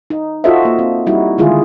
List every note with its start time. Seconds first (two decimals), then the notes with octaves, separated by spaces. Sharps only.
0.10 D#4
0.44 F4 F#4 A4 C5 D#5 E5
0.65 A#3
0.79 C4
1.07 G3 D#4 E4 F#4
1.38 D3 D#3 G#3 E4 F4 G#4